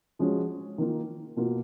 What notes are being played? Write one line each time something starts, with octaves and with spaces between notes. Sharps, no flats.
F3 G#3 C#4 F#4
D#3 A#3 F4
B2 A#3 F4